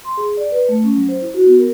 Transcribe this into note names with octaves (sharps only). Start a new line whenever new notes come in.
C6
G#4
D5
B4
A3
C#4
F#3
C5
E4
F#4
B3
A#4